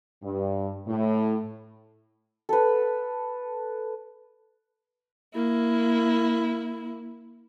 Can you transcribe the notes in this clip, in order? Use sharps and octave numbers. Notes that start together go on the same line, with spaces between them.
G2
A2
A4 B4
A#3 E4